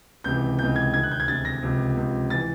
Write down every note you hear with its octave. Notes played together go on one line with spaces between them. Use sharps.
C#2 C3 E3 G6
C#2 C3 E3 G6
G#6
D2 C3 D#3 G#6
F#6
G6
G#6
D2 C3 D#3 A6
A#6
C#2 C3 F3
C#2 C3 F3
E3 A6